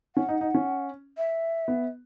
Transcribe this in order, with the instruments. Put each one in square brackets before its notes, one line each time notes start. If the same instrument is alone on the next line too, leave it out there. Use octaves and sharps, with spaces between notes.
[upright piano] C#4 [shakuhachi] F#5
[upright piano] D#4
D#4
C#4
[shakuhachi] E5
[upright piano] B3